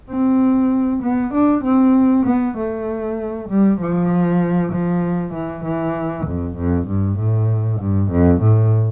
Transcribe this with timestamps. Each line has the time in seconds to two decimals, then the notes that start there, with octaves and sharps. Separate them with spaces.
0.10 C4
1.03 B3
1.34 D4
1.64 C4
2.26 B3
2.57 A3
3.49 G3
3.80 F3
4.72 F3
5.34 E3
5.65 E3
6.26 F2
6.57 F2
6.88 G2
7.18 A2
7.80 G2
8.11 F2
8.41 A2